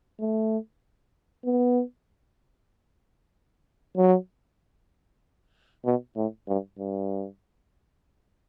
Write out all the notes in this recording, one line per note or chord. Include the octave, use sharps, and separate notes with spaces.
A3
B3
F#3
B2
A2
G2
G2